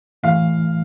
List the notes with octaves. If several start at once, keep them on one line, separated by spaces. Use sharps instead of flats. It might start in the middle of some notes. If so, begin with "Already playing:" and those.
A2 E3 A3 F5